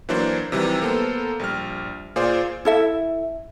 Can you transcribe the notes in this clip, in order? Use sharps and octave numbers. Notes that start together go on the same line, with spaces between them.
E3 F#3 A#3 D4 C5 D5
C3 D#3 E3 F#3 G3
A#3 B3 A4 C5
A#1 G3 F6
A#2 F4 G#4 C5 D5
E4 A4 E5